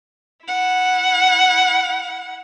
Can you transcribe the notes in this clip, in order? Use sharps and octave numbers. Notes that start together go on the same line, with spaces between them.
E4 F#5